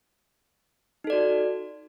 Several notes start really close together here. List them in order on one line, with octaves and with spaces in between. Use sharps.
D#4 A4 D5 F#4